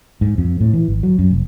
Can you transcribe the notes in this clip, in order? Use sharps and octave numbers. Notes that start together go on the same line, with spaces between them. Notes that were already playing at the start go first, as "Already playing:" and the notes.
G#2
F2
A2
E3
G#1
F#3
F#2
F1